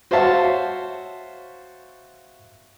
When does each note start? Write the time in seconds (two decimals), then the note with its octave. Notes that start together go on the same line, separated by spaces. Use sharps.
0.11 F#4 C5 C#5 E5 F5 A5